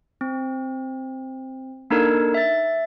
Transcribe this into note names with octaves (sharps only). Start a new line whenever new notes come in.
C4
A#3 D4 D#4 A4 A#4
E5 A6